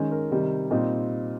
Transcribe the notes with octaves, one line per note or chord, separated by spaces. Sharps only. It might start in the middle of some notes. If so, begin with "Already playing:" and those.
Already playing: D#3 G#3 C#4
A#4
C3 D#3 G3
A#2 G3 C4 D#4